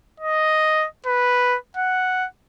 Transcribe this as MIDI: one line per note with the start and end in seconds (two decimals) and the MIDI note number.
0.20 0.86 75
1.06 1.57 71
1.77 2.26 78